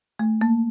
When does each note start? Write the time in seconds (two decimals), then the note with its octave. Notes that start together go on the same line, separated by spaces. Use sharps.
0.19 A3
0.41 A#3